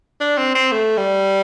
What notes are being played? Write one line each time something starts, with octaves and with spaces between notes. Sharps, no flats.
D4
C4
C4
A3
G3